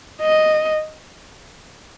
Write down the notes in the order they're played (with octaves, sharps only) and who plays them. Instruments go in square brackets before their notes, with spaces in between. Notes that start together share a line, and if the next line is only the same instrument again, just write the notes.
[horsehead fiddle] D#5